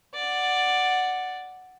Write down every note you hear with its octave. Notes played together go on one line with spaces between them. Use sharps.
D5 F#5